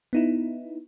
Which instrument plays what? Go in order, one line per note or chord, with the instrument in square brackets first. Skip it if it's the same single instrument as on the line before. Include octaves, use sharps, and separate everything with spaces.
[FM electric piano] B3 D#4 E4